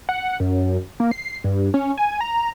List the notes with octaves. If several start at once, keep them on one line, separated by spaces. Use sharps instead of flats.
F#5
F#2
A#3
C7
G2
C#4
G#5
A#5